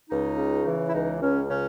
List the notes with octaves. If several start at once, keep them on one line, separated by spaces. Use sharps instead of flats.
C#2 D#4
C#3
E3
E4
C#2 D#4
C#2 C#4
C#3 C#4